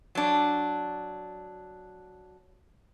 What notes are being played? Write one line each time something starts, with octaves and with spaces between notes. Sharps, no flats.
F#3 D4